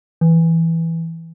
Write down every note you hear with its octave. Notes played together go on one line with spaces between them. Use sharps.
E3